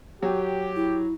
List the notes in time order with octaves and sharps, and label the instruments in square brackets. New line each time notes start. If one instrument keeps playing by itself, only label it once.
[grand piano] F#3 [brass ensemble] G4
[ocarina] E4